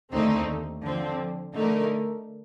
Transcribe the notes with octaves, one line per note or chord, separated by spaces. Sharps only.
D#2 D3 A3 C4 D#4
D3 F3 C4
D3 A3 D#4 A#4